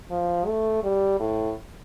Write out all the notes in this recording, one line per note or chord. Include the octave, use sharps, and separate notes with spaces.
F3
A3
G3
A2